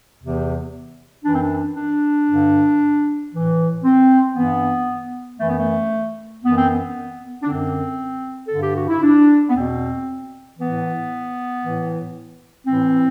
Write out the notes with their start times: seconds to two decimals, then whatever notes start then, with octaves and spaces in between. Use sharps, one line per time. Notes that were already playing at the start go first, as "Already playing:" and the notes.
0.20 E2 C3 E3
1.24 F#2 E3 D4
1.33 C4
1.42 D4
1.76 D4
2.28 G2 D3
3.33 A2 E3
3.84 C4
4.35 G2 E3 B3
5.39 F#2 E3 A3
5.48 B3
5.58 A3
6.43 F#2 E3 B3
6.56 C4
6.68 B3
7.43 D4
7.47 F#2 D3 C4
8.47 G2 D3 A4
8.61 G4
8.75 F#4
8.88 E4
9.03 D4
9.49 B3
9.55 E2 B2 C4
10.59 A2 E3 B3
11.62 A2 E3
12.66 A2 E3 C4